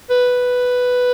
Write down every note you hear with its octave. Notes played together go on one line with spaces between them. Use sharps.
B4